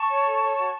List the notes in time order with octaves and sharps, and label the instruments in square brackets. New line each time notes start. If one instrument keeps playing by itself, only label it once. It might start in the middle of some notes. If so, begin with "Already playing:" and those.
Already playing: [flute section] A5 C#6
C#5
A4
C#5
F#4